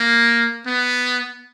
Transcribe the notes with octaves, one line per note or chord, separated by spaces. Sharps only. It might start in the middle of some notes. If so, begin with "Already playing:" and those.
Already playing: A#3
B3